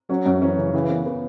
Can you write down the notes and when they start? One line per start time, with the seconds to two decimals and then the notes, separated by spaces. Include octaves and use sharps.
0.09 F#3 C#4
0.26 F#2
0.42 E3 C#4
0.58 C#3
0.73 C#3 E3
0.90 B3
1.06 B3